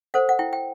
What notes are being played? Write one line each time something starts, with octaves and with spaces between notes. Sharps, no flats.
A4 C5 F#5
F#5
E4 G5
G5